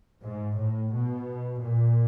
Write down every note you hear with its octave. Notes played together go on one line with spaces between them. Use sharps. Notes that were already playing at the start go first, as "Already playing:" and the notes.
G#2
A2
B2
A#2